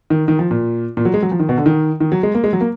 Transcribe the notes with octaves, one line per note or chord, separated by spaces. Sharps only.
D#3
D#3
F3
A#2
A#2
F#3
G#3
F#3
F3
D#3
B2
D3
D#3
D#3
F#3
G#3
A#3
G#3
F#3
A#3